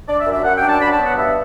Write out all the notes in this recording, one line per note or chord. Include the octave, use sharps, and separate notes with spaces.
D4 D5
E5
F#2
E5
F#2 F#5
G5
D4
A5
F#3 B5
A5
B3
F#5
G2 E5